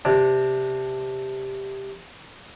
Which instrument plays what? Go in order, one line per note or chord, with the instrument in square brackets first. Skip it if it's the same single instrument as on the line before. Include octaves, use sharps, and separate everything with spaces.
[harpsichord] C3 D4